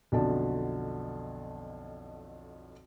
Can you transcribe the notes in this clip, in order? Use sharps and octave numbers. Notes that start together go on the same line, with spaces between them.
B1 F2 B2 D3 D5 A5